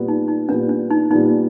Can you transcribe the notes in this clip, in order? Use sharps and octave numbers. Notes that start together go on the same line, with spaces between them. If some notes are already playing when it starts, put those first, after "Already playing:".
Already playing: A#2 G3 B3
D#4
D#4
A#2 G3 B3 D4
D4
D#4
A#2 G3 B3 D#4